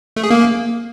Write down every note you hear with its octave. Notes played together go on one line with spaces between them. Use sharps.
A3
G#4
A#3